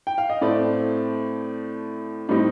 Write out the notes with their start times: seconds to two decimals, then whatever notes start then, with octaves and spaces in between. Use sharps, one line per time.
0.07 G5
0.18 F5
0.30 D#5
0.41 A2 A3 C4 D5
2.29 A2 G3 C4 D#4